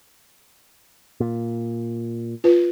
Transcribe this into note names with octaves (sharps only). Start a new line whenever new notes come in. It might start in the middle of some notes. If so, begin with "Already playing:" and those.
A#2
F4 B4